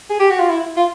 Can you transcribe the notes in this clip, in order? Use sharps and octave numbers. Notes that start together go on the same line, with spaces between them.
G#4
G4
F#4
F4
E4
F4